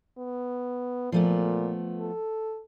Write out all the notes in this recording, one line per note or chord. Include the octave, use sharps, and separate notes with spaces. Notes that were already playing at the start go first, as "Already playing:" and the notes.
B3
A#2 F3 A3 B3
A4